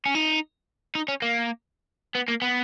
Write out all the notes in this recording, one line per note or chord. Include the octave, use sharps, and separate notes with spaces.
C#4
D#4
D#4
C#4
A#3
B3
A#3
B3